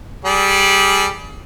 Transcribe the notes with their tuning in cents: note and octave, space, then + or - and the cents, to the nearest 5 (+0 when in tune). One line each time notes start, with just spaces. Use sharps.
G3 +0 G#4 +25 D5 +0